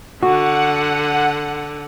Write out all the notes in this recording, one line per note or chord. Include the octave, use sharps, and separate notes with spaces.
D3 F#4 F#5